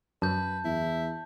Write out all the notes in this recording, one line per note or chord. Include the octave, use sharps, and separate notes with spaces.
F#2 B4 A5 G6
E2 E4